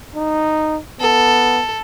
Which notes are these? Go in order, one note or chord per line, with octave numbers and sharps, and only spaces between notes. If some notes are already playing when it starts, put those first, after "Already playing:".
D#4
B3 A4